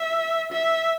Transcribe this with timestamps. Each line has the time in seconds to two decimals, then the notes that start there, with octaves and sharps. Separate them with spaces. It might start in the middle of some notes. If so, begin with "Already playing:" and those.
Already playing: E5
0.53 E5